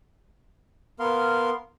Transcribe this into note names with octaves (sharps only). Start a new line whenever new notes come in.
B3 A#4 F5 C6